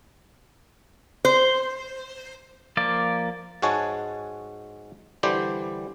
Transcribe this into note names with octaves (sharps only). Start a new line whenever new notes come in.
C5
F3 A#3 D5
G#2 G#3 F#4 C#5 G#5 A5
D3 E3 G3 G4 C5